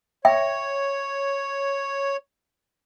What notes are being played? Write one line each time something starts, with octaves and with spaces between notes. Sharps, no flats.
C#5 E5 G5